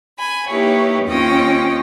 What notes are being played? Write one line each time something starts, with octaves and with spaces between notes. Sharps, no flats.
G#5 B5
A#3 D#4 E4 G4 B4 C#5
D#2 C4 C#4 F4 D#5 G5